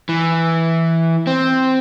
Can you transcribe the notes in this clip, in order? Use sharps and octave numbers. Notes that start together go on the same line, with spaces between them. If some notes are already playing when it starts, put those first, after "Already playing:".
E3
C4